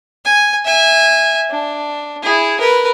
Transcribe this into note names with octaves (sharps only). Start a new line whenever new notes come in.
G#5
E5 G#5
D4
E4 G#4
A#4 B4